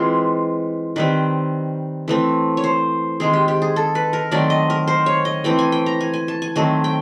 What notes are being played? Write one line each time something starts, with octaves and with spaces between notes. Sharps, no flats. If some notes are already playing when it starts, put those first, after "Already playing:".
Already playing: E3 G#3 C4 F4
D#3 G3 C4 B4
E3 A3 C4
C#5
C5
D#3 G#3 C4 G#4
G4
G4
G#4
A4
B4
A#4
D#3 F#3 A3 C4 D5
D#5
A#4
C5
C#5
D#5
E3 A3 C4 G5
G#5
G5
A#5
G#5
G#5
A5
G#5
D#3 F#3 A3 C4 G#5
G5